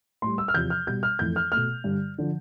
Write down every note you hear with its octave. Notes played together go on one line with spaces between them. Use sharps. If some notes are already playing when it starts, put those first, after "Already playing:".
A2 G3 C6
E6
F6
E2 C3 F3 G6
F6
B2 G3 G6
F6
F2 E3 A3 G6
F6
B2 A3 F6
G2 D3 G3
D3 F3